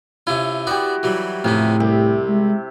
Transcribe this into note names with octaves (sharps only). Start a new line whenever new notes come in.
C3 C#4 E4 F4
B3 D4 F#4 G4 D5
E3 F#3 G3
F2 A2 C3 E3 C#4
C2 G4
G#3